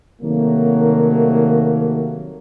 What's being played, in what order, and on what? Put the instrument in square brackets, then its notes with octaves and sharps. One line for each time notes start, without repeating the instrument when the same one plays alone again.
[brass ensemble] C3 D#3 F#3 G3 A3 A#3